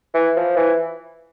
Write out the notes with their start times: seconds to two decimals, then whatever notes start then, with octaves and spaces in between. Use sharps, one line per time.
0.14 E3
0.36 F3
0.56 E3